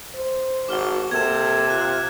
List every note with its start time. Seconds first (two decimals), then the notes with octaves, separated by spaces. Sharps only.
0.15 C5
0.68 G#1 F#4 D6 F6 G7
1.11 C3 A#3 A4 G#6 E7
1.70 F4 F#6